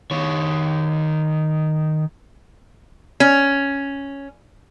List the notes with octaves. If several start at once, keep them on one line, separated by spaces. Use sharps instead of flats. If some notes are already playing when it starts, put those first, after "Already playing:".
D#3 C#5
C#4